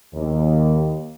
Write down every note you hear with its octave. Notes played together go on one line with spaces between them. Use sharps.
D#2